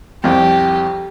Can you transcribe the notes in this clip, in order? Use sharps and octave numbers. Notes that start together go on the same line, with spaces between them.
C2 F2 G4